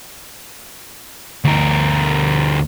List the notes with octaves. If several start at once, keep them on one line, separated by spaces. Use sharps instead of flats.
D2 A#4